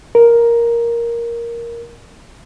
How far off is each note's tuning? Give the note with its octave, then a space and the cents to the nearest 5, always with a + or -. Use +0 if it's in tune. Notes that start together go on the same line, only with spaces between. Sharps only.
A#4 +5